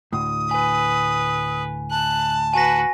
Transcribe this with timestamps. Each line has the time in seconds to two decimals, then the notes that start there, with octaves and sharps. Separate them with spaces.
0.13 D2 A2 D#6
0.51 B4 G#5
1.91 A5 F#6
2.54 F#4 B4 G#5 A#6